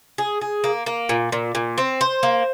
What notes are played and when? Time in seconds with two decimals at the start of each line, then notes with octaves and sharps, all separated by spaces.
0.18 G#4
0.41 G#4
0.64 A#3
0.86 A#3
1.09 A#2
1.32 A#2
1.55 A#2
1.78 C4
2.01 C5
2.23 A#3